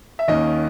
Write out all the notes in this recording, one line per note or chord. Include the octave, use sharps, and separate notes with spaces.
E5
D#2 D#3 A#3 C#4 D#5